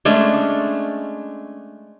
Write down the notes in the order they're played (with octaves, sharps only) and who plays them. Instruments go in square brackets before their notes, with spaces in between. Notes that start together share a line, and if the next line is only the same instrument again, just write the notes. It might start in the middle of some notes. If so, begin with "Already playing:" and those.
[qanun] G#3 A3 C#4 D4